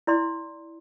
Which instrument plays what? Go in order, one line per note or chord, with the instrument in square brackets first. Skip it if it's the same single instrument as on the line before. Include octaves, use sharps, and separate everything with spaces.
[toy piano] E4 D5 C6